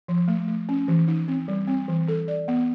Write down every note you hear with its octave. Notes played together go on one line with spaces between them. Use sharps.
F3
A3
A3
C#4
E3
D#4
C4
G3
C4
E3
A4
D5
B3